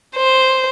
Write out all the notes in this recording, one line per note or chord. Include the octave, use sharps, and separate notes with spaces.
C5